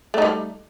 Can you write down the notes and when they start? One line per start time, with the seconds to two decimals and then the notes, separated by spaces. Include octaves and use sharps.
0.14 A3
0.18 D#4
0.22 G3